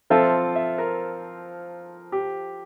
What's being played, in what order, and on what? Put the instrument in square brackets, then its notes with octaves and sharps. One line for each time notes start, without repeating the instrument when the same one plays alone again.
[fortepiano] F3 C4 F4 A4 [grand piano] E5
[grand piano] E5
A#4
G4